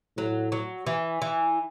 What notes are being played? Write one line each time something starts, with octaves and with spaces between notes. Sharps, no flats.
A2 F#3
F#3
E3
E3